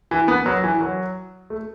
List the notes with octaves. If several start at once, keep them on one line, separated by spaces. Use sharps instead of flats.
E3
B3
F#3
E3
F#3
A3